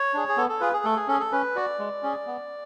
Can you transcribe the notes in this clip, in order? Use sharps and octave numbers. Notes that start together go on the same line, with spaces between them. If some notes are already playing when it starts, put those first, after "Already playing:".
Already playing: C#5
D4 G#4
G#4
B3 A4
A4
F4 G#4 B4
G#4
A3 A4
G#4
C#4 G#4 A4
A4
C#4 B4
F#4 D5
G#3
C#4 G#4
B3